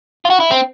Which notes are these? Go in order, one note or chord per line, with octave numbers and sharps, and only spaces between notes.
F4
F#4
E4
C4